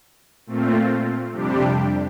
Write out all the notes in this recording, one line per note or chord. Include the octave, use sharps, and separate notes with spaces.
A#2 A3 C4 F4
F2 C3 G3 D4 G4